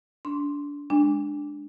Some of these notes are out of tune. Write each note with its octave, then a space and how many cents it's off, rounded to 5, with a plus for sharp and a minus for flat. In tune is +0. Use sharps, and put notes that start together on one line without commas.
D4 -25 C6 +0
G#3 +0 D4 +0 G#5 -40